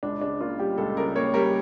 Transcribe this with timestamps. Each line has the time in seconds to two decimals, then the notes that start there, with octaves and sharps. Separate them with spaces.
0.03 C#2 D4
0.21 C#3 D4
0.41 A#3 F4
0.59 G3 G4
0.78 C#2 A4
0.97 C#3 A#4
1.16 A#3 C#5
1.34 G3 A#4